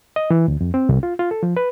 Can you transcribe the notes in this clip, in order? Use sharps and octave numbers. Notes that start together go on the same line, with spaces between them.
D#5
E3
D2
F2
C4
C2
F4
F4
A4
F3
B4